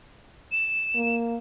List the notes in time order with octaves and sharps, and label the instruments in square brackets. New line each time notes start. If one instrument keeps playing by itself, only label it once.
[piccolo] E7
[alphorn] A#3